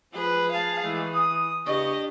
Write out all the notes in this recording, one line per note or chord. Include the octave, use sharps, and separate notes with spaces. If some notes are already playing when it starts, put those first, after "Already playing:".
F3 G#4 B4
F5 G#5 A5
E3 G#3 A3
D#6
E2 C#3 D4 G4 D#5 C#6